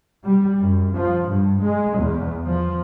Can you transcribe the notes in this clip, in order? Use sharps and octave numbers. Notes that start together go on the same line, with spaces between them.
G3
F#2
F3
G2
G#3
E2
F3